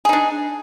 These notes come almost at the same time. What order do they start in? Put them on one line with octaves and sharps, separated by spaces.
G#4 D#4 D4